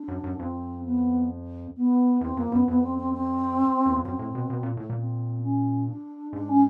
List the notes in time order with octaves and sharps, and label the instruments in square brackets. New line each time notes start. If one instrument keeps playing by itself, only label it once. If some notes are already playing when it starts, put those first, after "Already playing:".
Already playing: [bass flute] D4
[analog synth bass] F#2
F#2
[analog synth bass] F2 [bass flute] C4
[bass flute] B3
B3
[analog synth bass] E2 [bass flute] C4
[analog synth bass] F2 [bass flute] A#3
[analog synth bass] F#2 [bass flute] B3
[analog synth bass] F2 [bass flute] B3
[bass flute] C4
C4
C4
[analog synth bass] E2
F2
[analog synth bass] F#2 [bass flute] C4
[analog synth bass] A2
B2
B2
A#2
A2
A#2
[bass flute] C4
C#4
D4
[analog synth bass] G#2 [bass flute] D4
[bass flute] C#4